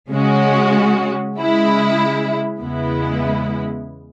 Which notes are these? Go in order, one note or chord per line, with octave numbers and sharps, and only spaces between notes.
C#3 G#3 C#4 F#4
C#3 G#3 E4
E2 C#3 G#3 B3 E4